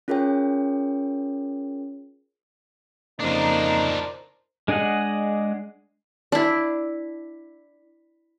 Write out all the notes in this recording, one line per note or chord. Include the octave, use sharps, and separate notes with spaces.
C#4 F4 G#4 A#4 C#5 G5
F2 C#3 A#3 D4 D#4 F4 A#4 C5
G#3 D4 G#4 D#5 F#5
D4 E4